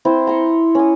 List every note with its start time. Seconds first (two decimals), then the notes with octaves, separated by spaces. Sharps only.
0.05 C4 E4 C5
0.27 A#5 C6 C#6
0.75 C#4 D#6